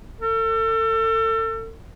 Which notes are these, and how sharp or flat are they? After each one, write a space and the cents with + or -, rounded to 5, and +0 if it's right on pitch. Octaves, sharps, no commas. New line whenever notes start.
A4 +35